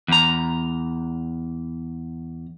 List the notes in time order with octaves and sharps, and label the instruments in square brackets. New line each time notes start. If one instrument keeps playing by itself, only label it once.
[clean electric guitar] E2 A#5